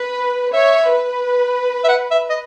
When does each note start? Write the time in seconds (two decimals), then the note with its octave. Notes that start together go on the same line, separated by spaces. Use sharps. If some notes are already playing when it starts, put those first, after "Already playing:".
Already playing: B4
0.53 C#5 E5
0.88 B4
1.84 E5
1.89 F#5
2.11 E5
2.30 D#5